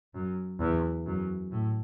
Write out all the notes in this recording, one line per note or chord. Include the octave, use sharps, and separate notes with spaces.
F#2
E2
F#2
A2